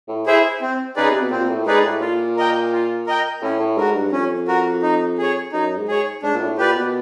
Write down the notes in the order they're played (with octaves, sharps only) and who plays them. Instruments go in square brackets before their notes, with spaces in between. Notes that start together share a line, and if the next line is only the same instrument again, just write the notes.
[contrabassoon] A2
[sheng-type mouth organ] E4 G#4 C5 E5
C4
[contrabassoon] C#3 [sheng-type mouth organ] D#4 G#4 B4 D5
[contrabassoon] C3
B2
[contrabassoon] A#2 [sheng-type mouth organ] C4
[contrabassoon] A2
[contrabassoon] G#2 [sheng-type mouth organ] D#4 G#4 B4 D5
[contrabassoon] A2
[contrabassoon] A#2 [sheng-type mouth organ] F4
[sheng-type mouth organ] A#4 D#5 G5
F4
A#4 D#5 G5
[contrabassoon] A2 [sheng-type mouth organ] C#4
[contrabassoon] A2
[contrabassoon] G#2 [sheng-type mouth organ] F#4 A#4
[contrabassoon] G2
[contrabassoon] F2 [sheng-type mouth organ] C#4
[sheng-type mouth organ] F#4 A#4
D#4
G#4 C#5
[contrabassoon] F#2 [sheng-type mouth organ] D#4
[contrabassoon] G#2
[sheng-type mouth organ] G#4 C#5
[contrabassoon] G#2 [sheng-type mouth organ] D4
[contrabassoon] A#2
A2
[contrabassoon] A#2 [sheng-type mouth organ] G4 B4 D5
[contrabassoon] B2